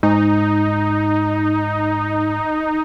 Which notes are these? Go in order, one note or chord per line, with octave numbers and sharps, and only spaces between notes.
G#2 D#4